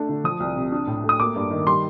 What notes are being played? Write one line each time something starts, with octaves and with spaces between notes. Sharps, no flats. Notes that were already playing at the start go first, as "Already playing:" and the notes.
Already playing: A3 D4
D3
F3 D#6
C2
C3
D4
A2
A3
D#6
A#3 D6
G2
D#3
G3 C6